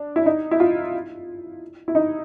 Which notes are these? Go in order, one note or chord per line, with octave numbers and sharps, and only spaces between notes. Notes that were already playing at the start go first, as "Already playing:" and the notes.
Already playing: D4
E4
D#4
E4
F4
E4
D#4